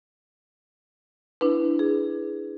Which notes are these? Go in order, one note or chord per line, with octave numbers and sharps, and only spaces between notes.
D4 E4 B4
G#4